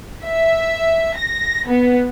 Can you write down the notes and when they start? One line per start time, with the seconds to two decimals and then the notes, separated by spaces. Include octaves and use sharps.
0.24 E5
1.15 A#6
1.66 B3